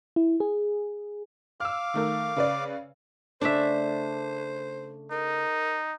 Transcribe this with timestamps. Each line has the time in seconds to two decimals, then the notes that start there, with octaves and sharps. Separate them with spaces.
0.16 E4
0.40 G#4
1.60 F5 D6 E6 F6
1.94 D#3 A3 A#4
2.36 C#3 B4 D5
3.41 C#3 A3 D4 C5 D5 E5
5.11 D#4 A#4